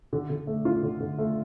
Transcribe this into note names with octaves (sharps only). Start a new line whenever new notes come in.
D3
D3
A3
F4
D3
D3
A3